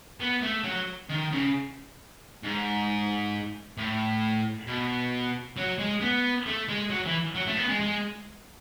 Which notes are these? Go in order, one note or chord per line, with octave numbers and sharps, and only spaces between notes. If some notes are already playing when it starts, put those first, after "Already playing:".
B3
A3
F#3
D#3
C#3
G#2
A2
B2
F#3
G#3
B3
A3
G#3
F#3
E3
F#3
A3
B3
G#3
G#3